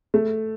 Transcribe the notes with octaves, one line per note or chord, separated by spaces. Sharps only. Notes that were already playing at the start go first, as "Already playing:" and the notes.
A3